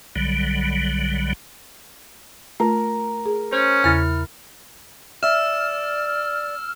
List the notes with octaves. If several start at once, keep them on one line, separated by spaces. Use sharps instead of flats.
B1 D3 F#3 G3
A3 F4 A#4
G#4
C#4 C5
E2 C#3 E4 F6 A6
D5 E5 E6 F6 E7